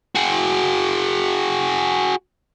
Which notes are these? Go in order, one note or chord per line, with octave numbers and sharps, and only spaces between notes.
F#4 G#4